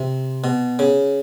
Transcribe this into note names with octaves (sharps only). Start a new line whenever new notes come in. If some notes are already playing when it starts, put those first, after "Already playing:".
Already playing: C3
B2
C#3